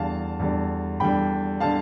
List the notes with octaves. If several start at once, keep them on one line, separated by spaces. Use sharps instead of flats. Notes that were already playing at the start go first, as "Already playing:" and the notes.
Already playing: E2 D3 G3 F5 A5
E2 D3 G3
E2 D3 G3 G5 B5
D3 G3 F5 A5